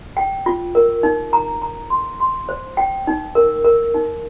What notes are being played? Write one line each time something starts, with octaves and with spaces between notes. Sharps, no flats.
G5
F4
A#4
D#4
A#5
A#5
C6
C6
C5
G5
D#4
A#4
A#4
D#4